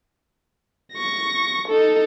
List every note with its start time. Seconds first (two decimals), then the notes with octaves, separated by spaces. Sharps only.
0.94 C#6 A#6
1.68 D#4 A4